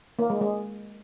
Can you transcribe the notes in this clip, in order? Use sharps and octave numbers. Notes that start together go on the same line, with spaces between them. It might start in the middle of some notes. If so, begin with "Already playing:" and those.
A#3
G#3
G#3